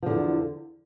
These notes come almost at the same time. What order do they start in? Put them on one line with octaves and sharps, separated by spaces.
F3 D3 E2